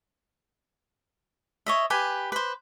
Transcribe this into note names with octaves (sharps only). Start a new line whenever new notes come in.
C#5 D#5 E5
G4 B4 G#5
B4 C5